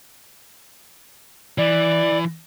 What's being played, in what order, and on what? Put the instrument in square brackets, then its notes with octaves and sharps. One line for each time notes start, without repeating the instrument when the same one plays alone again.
[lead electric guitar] E3 [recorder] D5